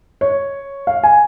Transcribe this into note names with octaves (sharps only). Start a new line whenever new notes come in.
C#5
F5
G#5